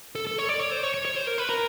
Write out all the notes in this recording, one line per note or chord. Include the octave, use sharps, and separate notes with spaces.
A4
A4
C#5
D5
C#5
C5
C#5
C#5
C#5
C5
A#4
B4
A#4